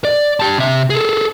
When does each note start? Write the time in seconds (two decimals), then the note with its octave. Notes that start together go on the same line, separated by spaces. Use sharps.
0.05 D5
0.40 G4 A5
0.58 C3 E5
0.90 G#4 A4